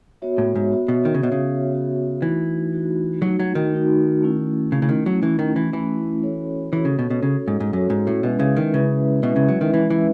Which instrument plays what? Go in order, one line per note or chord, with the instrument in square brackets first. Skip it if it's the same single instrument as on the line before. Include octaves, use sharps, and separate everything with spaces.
[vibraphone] B3 F#4 C#5 E5
[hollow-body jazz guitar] A2
G#2
[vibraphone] B3 F#4 C#5 E5
[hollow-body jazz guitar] B2
D#3
C#3
[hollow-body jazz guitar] B2 [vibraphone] B3 F#4 C#5 E5
[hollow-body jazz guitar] C#3
[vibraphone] B3 F#4 C#5 E5
[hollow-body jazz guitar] E3 [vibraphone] A3 D#4 F#4
[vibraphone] A3 D#4 F#4
[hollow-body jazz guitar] F#3 [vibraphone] A3 D#4 F#4
[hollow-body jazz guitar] F#3
D#3
[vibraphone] A3 D#4 F#4
A3 C#4 E4
[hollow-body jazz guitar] C#3 [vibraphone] A3 C#4 E4
[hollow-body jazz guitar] C#3
D#3
F#3
[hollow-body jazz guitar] E3 [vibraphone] A3 C#4 E4
[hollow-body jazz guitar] D#3
E3
[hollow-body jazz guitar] E3 [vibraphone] A3 C#4 E4
[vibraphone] C#4 F#4 A4 C#5
[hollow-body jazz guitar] E3 [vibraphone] C#4 F#4 A4 C#5
[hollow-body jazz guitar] C#3
B2
B2
[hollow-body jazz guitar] C#3 [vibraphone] C#4 F#4 A4 C#5
[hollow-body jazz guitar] G#2
G#2
[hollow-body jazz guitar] F#2 [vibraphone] C#4 F#4 A4 C#5
[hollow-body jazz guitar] G#2
A2
[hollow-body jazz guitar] B2 [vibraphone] G#3 C#4 E4 B4 E5
[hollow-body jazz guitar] C#3
D#3
[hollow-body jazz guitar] C#3 [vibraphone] G#3 C#4 E4 B4 E5
[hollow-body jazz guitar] B2 [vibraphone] G#3 C#4 E4 B4 E5
[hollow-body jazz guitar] C#3
F#3
D#3
[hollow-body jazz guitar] E3 [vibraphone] G#3 C#4 E4 B4 E5
[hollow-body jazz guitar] E3